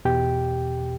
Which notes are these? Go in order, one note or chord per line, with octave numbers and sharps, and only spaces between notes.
E2 B2 G4 G5